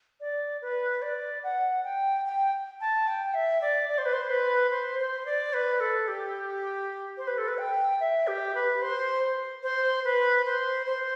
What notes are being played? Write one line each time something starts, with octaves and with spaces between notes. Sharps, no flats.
D5
B4
D5
F#5
G5
G5
A5
G5
E5
D5
D5
C5
B4
C5
B4
C5
C5
D5
B4
A4
G4
C5
B4
A4
B4
G5
E5
G4
B4
C5
C5
B4
C5
C5